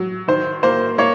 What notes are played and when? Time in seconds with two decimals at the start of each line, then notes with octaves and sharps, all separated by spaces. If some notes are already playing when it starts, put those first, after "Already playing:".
Already playing: F#3
0.28 D#3 C5
0.63 A#3 C5
0.98 A#3 C#5